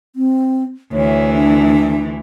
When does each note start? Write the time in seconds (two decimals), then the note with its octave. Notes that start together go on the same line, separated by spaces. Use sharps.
0.16 C4
0.93 D2 E3 C#5
1.35 D4